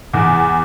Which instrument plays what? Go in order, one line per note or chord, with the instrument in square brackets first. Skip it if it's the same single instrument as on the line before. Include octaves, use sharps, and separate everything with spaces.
[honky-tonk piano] E2